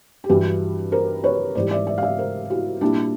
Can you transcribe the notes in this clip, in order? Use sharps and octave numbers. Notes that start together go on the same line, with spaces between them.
G4
G2 E3 G3 E4 F#4
A#4 C5
B4 C#5
G#2 E3 G3 C5 D5
D5 E5
D5 E5
F5
D5 E5
A#4 C5
E4 F#4
A#2 G3 D4 E4